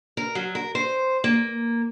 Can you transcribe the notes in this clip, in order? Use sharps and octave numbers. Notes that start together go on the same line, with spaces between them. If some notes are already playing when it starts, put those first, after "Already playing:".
A#4
F#3
A#4
C5
A#3